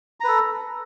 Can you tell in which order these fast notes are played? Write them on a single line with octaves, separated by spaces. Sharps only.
A#5 B4 A4